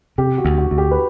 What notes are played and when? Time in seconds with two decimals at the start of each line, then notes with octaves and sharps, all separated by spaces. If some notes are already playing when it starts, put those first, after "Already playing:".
0.18 C3 G4
0.38 F#4
0.45 D2
0.58 F#4
0.71 D2
0.78 G4
0.91 B4